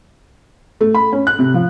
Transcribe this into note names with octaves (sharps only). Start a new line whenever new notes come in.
A3
B5
C#4
F#6
C3
F3